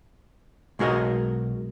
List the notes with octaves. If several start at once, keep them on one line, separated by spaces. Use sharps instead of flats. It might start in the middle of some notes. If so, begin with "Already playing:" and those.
B1 G#3 F#4 A#4 D#5